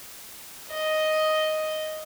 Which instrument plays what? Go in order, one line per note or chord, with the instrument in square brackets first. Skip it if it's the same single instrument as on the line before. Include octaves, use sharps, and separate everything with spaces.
[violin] D#5